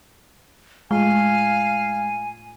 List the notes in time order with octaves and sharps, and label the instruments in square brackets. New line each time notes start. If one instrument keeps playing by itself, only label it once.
[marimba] A2 A3 F4 [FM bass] G#3 [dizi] F5 [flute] G#5